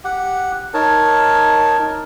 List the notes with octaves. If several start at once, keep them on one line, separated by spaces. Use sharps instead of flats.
G4 F#5
D#4 A#4 C#5 A5